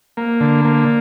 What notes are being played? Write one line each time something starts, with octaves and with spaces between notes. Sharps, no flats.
A#3
D3
A#3